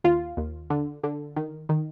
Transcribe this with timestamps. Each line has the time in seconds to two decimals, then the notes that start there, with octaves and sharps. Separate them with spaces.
0.04 D#2 F4
0.37 D#2
0.70 D3
1.03 D3
1.36 D#3
1.69 D#3